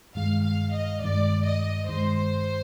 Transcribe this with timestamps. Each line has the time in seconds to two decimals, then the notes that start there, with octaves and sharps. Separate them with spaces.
0.15 G2 D#3 G#3 F5
0.45 F5
0.73 D#5
1.01 G2 D#3 G#3 D5
1.46 D#5
1.88 G2 D#3 G#3 C5